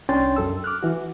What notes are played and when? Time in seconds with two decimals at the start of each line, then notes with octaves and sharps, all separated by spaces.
0.09 C2 C#4 D4 G5 C6 A6
0.36 F#2 A4 E6
0.64 D6 F6 F#6
0.83 E3 F#4